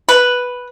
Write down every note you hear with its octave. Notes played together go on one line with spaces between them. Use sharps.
B4